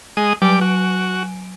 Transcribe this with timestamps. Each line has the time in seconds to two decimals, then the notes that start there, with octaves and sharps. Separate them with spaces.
0.17 G#3 D#6
0.42 F#3 G3 G#5 D6 D7
0.61 F#4